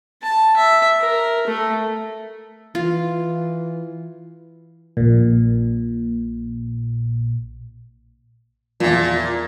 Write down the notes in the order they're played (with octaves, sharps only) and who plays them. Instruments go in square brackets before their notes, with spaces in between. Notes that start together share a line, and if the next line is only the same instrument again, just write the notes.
[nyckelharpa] A5
E5
A#4
A3
[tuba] E3 [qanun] F4
[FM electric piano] A#1 A#2
[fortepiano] E2 F3 [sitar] A#2